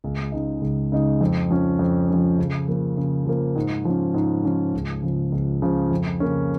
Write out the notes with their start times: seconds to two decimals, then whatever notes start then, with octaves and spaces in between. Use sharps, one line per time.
0.04 C#2
0.32 C#3 G#3 D#4
0.61 C#2
0.92 C#3 G#3 D#4
1.21 F2
1.50 F3 C#4
1.79 F2
2.09 F3 C#4
2.39 C#3
2.68 F3 A#3
2.97 C#3
3.27 F3 A#3
3.55 G#2
3.85 F3 C#4
4.14 G#2
4.44 F3 C#4
4.74 C#2
5.02 C#3 F3
5.32 C#2
5.62 C#3 F3
5.91 F2
6.20 C#3 A#3 C#4